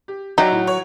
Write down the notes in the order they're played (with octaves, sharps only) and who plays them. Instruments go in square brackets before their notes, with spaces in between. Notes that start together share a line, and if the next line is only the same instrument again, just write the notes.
[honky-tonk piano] G4
[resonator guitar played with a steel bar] F#3 [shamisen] D#4 [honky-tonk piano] D5 E5 G5
[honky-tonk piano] A2
C#5